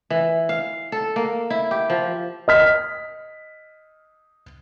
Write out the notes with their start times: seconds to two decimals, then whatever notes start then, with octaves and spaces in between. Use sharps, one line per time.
0.10 E3
0.49 F5
0.92 A4
1.16 A#3
1.50 E4
1.71 G4
1.90 F3
2.48 D#5 F6 B6